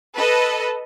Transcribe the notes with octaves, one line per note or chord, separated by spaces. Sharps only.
A4 B4 D#5